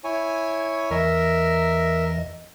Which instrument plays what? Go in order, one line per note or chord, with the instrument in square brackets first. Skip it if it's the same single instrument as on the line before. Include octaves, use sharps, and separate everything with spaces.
[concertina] E4 C#5 G#5
[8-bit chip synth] E2 E3 D#5 [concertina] A#4 E5